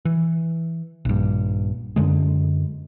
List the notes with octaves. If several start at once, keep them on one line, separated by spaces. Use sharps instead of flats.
E3
A#1 G2
F#2 D3 G#3